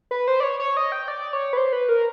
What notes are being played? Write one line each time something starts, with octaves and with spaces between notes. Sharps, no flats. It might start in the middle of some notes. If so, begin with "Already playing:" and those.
B4
C5
D5
C#5
C#5
D#5
G5
D5
C#5
B4
C5
B4
A#4